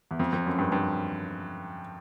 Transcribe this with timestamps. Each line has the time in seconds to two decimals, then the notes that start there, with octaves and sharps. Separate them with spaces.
0.11 E2
0.19 F2
0.33 F2
0.46 F#2
0.58 G2
0.72 G2